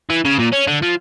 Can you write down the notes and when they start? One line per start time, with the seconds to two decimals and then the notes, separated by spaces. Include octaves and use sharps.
0.10 E3
0.25 C#3
0.39 A#2
0.53 C#4
0.68 D3
0.82 F3